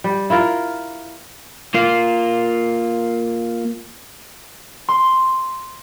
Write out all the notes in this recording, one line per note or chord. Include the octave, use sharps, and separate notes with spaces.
G3
E4 F4 A#4
A#3 F4
C6